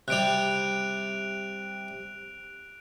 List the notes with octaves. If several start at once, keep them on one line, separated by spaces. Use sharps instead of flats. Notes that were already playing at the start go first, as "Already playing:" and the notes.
C3 G3 F#6 D7 F7